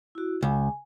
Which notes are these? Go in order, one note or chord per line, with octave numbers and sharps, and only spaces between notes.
E4 F#4
C#2 G#5